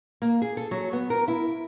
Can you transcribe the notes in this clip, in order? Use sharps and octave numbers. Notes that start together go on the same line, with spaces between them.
A#3
G#4
A4
F#3
B3
A#4
E4